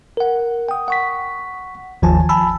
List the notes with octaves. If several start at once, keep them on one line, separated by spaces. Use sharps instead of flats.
A#4 F#5
G5 D#6
F#5 C#6 B6
G1 D#2 D#3 F3 G#5 A5
G#5 A5 B5 E6